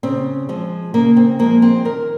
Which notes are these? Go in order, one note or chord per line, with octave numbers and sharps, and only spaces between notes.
C#3 C4
F3 G#3
C#3 A#3
C4
F3 G#3 A#3
C4
D#3 A#4